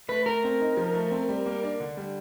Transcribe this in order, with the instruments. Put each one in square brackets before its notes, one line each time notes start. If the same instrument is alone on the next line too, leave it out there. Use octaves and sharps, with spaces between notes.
[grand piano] A3 [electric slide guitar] B4
[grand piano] A3 [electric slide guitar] A#4
[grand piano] C4
D#4
F3
A3
C4
G3
A#3
D4
D3
G3